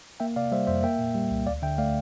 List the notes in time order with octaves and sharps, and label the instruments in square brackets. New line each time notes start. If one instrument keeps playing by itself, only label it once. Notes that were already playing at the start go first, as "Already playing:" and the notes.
[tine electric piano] A#3 E5 G5
C3 D5 F5
G3 C5 E5
F2 C5 E5
A#3 E5 G5
A#2
G3
C2
D2 D5 F5
D3 E5 G5
A3 D5 F5